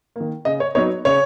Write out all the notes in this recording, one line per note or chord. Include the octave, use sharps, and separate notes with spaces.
D#3 A#3
C#3 D#5
C#5
F#3 B3 D#4 C#5
C#3 C#5